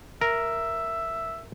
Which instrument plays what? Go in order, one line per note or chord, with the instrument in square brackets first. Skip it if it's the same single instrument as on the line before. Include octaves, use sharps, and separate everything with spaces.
[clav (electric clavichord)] A#4 [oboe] E5